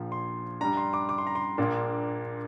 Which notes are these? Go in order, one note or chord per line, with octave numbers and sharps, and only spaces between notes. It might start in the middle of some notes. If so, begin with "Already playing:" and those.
Already playing: A#1 A#2 F3
C6
G2 G3 D4 A#5
C6
D6
D6
C6
A#5
C6
A#1 A#2 A#3 D4